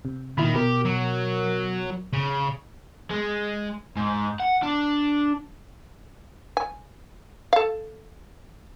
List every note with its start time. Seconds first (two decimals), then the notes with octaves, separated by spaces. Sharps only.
0.05 C3
0.38 A#2 D#3 E4 B5
0.54 B2 G4 A#4
0.85 F#3
2.13 C#3
3.11 G#3
3.97 G#2
4.40 F#5
4.63 D4
6.57 G#5
7.53 A4 F5